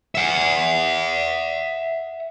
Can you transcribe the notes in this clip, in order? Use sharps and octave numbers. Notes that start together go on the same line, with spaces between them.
E5 F#5